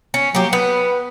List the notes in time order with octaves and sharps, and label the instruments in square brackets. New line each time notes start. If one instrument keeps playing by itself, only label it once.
[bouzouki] C#4
[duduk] F#3 [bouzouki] A#3 G4
[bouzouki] B3 [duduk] B4